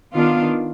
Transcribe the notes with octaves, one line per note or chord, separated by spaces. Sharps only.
D#3 B3 D4 F4